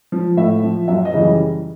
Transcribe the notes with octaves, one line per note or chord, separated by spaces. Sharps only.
F3
A2 E5
F3
F#2 E5
D#5
C#3 E3 G3